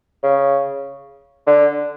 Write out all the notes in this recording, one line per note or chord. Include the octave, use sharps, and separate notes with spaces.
C#3
D3